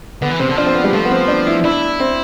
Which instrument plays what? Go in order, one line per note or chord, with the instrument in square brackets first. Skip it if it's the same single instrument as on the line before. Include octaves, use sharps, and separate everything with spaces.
[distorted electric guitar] D3 [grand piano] B3
[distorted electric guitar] E3
[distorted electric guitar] C3 [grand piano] C4
[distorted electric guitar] D3
[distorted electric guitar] F3 [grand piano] D4
[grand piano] C4
B3
G3
[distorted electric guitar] F3 [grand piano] A3
[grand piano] B3
C4
D4
E4
[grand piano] D4 [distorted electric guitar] E4
[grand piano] C4